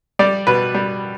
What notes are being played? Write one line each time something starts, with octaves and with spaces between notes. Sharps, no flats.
G3 D5
B2 B4
G3